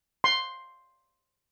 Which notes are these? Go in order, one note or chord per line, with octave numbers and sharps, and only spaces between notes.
C6